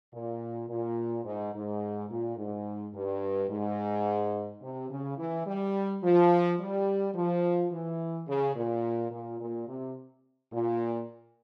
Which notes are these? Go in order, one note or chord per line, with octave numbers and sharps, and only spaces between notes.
A#2
A#2
G#2
G#2
A#2
G#2
G2
G#2
C3
C#3
E3
G3
F3
G3
F3
E3
C#3
A#2
A#2
A#2
C3
A#2